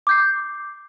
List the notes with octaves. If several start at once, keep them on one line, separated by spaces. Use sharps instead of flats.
D6 G6 C7